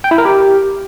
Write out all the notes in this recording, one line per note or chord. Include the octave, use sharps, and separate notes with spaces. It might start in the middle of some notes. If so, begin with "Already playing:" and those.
G5
E4
A#4
G4